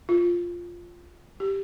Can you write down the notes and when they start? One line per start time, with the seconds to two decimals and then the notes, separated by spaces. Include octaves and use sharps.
0.09 F4
1.40 G4